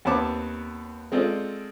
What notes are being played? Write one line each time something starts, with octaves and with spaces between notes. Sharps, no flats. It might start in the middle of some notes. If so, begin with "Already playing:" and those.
D#2 B3 C4 C#5 A5 D6
G#3 C4 F4 A4 D5